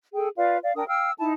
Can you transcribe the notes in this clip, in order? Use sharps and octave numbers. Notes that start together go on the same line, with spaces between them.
G#4 A4 G5
F4 B4 D5 F5
D5 F5
D4 A#4 G5 D#6
F5 G5 E6 F6
D#4 E4 A5